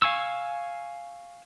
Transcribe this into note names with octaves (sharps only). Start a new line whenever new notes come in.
F5 G#5 C#6 E6